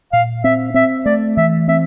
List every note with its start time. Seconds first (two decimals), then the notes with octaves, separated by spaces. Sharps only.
0.13 A#2 F5
0.44 C4 E5
0.74 C4 E5
1.05 A3 D5
1.37 E3 E5
1.68 C4 E5